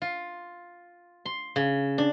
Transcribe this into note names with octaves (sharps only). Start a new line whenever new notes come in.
F4
C6
C#3
D4